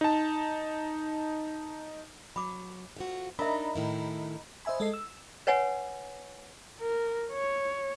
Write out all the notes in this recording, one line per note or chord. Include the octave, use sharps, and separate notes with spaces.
D#4 A5
F#3 B5 D6
F2 F4 F#4
D4 D#4 A#4 D#5 E5 A#5 B5
A2 D#3 E4
C5 D#5 E5 G#5 B5
G#3 A4 D#5 C7
E6
B4 C#5 F#5 G#5
A#4
C#5